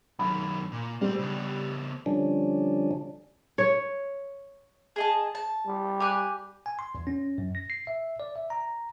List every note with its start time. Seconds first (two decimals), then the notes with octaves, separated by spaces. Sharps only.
0.19 F#2 D#3 B5
0.72 A#2
1.01 G3 A#3 C5
1.19 C#3 B3
2.06 D3 F3 G3 C#4 D4
3.58 C#5
4.96 G#4 D#5 A5
5.35 A5
5.66 G3
6.00 G4 G#5 F#6
6.66 G#5
6.79 C6
6.95 E2
7.07 C#4
7.38 F#2
7.55 A#6
7.70 C7
7.87 E5
8.20 D5
8.36 E5
8.50 A#5